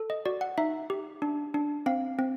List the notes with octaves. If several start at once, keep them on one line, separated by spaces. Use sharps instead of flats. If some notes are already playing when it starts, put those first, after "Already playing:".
Already playing: A4
D#5
F#4 D5
F#5
D#4 E5
G4
D4
D4
C4 F5
C4